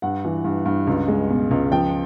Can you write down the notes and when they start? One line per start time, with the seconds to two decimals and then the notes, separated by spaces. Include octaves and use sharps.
0.02 G2 F#5
0.25 E3
0.44 G2
0.66 G2
0.87 C#2
1.08 G#3
1.29 B2
1.51 C#2
1.72 F3 G5